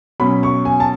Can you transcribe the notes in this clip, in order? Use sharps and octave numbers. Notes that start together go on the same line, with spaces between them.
B2 F#3 C#4 B5
C#6
G#5
A5